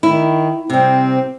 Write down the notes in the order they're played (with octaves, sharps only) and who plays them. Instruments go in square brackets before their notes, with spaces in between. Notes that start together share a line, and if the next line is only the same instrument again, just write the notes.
[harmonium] D#3 [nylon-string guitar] E4
[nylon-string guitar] C3 G3 [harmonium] C4